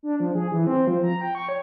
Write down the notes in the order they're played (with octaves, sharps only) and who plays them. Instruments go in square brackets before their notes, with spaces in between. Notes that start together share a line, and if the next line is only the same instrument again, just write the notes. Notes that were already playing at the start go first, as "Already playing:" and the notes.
[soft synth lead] D4
F3
G#4
E3
C4
F3
A#5
G5
C#6
C#5